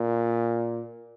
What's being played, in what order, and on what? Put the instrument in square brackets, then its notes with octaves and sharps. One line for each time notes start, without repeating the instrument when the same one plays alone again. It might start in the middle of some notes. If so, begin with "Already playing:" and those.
Already playing: [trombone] A#2